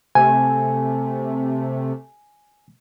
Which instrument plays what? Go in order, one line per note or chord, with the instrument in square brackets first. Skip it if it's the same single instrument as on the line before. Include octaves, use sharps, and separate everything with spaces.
[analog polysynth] C3 A3 [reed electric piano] G#5